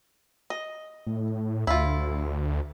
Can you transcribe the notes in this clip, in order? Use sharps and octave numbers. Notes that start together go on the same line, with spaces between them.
D#5
A2
D2 E4 F4